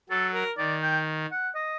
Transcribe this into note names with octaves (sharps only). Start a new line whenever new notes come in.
F#3 A4
A#4
D#3 D5
G5
F#5
D#5